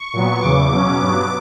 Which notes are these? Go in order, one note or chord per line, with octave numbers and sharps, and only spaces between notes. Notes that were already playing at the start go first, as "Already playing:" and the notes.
Already playing: C#6
A#2 F#3 B3
E2 C#3 E3 D6
B2 F#3 C#4
G2 F#3 B3